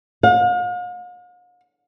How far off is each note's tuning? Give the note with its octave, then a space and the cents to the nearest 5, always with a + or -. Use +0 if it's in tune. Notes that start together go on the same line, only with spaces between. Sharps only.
F5 +45